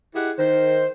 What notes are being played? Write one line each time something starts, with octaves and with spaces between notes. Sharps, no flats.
E4 G4 G#4 D#5 F#5
D#3 C5